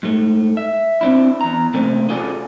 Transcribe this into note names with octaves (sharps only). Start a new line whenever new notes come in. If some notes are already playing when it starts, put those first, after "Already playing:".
G#2 A3
E5
C4 D4 E4
E2 A#5
C3 A3 A#3 C4 C#4
C#4 F4 F#4 G#4 A4 D5